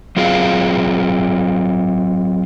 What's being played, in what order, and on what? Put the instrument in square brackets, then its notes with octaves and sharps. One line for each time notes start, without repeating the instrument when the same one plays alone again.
[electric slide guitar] F#3 C4 F4 G#4 F5